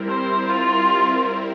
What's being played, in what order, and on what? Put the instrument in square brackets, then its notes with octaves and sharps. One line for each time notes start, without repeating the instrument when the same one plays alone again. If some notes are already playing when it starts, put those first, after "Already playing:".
Already playing: [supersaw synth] G3 C4 E4 A#4
[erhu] C5
F4